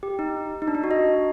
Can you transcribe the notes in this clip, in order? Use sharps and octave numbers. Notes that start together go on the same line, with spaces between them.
G4
D#4
D#4
D4
D#4
F#4
D#5